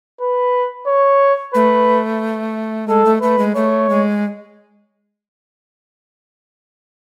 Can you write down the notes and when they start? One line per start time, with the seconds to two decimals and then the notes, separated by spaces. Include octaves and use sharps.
0.21 B4
0.87 C#5
1.54 A3 B4
2.88 G#3 A4
3.05 A3
3.21 A3 B4
3.39 G#3
3.55 A3 C#5
3.89 G#3